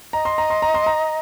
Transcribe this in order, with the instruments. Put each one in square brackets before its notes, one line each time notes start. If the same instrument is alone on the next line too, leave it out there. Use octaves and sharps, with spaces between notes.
[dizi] D#5 [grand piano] A#5
[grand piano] C6
A#5
C6
A#5
C6
A#5